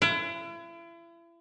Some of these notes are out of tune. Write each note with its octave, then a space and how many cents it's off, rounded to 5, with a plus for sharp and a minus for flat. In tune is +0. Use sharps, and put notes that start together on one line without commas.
E4 +40